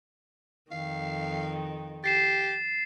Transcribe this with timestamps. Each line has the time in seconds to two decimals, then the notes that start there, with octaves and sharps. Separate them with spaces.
0.71 F2 D#3 F5
2.04 G4 A6 C7 E7